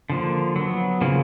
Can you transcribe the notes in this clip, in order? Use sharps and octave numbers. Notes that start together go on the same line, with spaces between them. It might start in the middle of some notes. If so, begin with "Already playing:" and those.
D3 F3 A#3
F#3 B3
C#3 F3 A#3